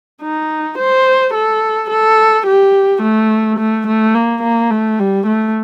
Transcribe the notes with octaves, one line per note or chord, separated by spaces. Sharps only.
D#4
C5
A4
A4
G4
A3
A3
A3
A#3
A#3
A3
G3
A3